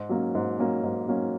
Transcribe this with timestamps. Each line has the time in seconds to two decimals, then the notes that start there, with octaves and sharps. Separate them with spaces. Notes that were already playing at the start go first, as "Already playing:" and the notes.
Already playing: G#2
0.09 F#3 A#3 C#4
0.35 G#2
0.59 F#3 A#3 C#4
0.83 G#2
1.08 F#3 A#3 C#4